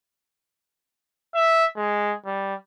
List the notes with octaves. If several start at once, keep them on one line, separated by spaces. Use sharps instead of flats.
E5
G#3
G3